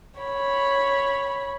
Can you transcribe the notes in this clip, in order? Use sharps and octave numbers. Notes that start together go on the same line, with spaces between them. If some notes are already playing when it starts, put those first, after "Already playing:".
C#5 B5